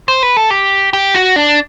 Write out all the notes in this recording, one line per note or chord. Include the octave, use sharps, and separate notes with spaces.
C5
B4
A4
G4
G4
F#4
D4